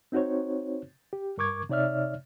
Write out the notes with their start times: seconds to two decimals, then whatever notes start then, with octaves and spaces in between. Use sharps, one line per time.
0.12 C4 D#4 F#4 C5 C#5
1.13 G4
1.38 G2 A#4 C#6 D6 G#6
1.69 C3 D#4 C#5 D5 E5 F6